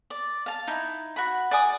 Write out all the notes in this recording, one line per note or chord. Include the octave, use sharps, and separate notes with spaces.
D5
F5 A5
D#4 E4
F#4 F#5 B5
D5 F#5 G#5 D#6